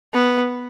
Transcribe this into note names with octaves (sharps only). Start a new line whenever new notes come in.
B3